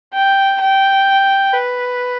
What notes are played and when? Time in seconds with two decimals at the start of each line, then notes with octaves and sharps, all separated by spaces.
0.13 G5
0.60 G5
1.53 B4